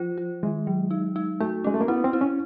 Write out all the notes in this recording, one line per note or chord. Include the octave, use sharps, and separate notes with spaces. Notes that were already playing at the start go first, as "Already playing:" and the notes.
Already playing: F3 F4 C5
F4
D#3 G#3
F#3
D#4
D#4
A3 F#4
G#3 C#4
A3
A#3
B3 E4
C4
E4
C#4